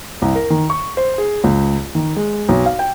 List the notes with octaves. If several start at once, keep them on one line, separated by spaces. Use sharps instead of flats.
C2
A#4
D#3
C#6
C5
G#4
C#2
D#3
G#3
B1
F5
G5